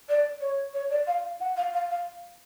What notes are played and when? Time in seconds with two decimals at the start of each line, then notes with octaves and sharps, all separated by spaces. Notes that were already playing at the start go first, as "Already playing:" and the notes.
0.09 D5
0.41 C#5
0.73 C#5
0.90 D5
1.07 F5
1.24 F5
1.40 F#5
1.56 F5
1.73 F5
1.90 F5